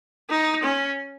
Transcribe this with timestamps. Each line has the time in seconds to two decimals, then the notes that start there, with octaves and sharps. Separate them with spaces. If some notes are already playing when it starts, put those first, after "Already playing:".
0.30 D#4
0.63 C#4